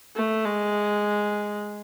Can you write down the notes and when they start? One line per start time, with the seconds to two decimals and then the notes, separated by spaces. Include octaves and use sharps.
0.16 A3
0.44 G#3